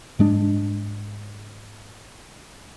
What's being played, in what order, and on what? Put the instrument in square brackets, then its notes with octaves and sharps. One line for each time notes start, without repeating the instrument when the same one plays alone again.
[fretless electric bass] G#2 G#3 D4